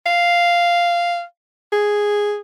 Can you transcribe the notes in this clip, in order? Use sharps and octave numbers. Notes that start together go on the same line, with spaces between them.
F5
G#4